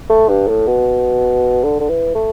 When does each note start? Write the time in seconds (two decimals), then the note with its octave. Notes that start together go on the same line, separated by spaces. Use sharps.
0.10 A3
0.29 G2
0.48 A2
0.67 B2
1.64 D3
1.80 D3
1.89 E3
2.15 A3